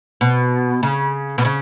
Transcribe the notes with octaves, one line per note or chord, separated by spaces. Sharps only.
B2
C#3
B2
C#3